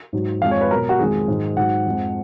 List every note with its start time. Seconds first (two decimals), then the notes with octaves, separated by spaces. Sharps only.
0.13 G#2 F#3
0.42 F2 D#3 G#3 F5
0.51 C#5
0.61 B4
0.70 F#3 A#4
0.74 B2
0.89 F#4
0.99 F2 D#3 G#3 G#4
1.28 G#2 D#3 F#3
1.57 G#2 F#3 F#5
1.85 F2 F3 G#3